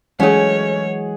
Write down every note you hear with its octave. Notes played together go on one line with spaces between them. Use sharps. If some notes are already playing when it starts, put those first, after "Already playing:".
E3 F#3 G#3 A3 C#4 G#4 C#5 F#5